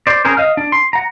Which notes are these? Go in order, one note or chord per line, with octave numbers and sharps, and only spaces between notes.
C5 D5
C4 C#4 G#4 A#4 C5
D#5 F5 F6
D4
C6
F#5 A#5